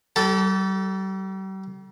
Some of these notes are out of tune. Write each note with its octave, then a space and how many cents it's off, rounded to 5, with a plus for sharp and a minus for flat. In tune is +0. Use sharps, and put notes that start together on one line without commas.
G3 -40 A4 +0 A5 +0